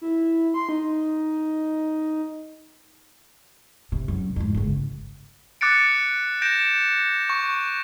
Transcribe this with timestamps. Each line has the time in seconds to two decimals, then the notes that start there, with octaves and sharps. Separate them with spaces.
0.01 E4
0.54 C6
0.69 D#4
3.92 C3
4.08 F#2
4.36 F2 G#2
4.54 G1 C#2
5.61 D6 F#6 A6 C#7 D7
6.42 G6 A#6 D7 E7
7.30 C#6